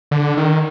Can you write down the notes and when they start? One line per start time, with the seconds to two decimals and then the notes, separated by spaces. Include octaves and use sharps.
0.11 D3
0.37 D#3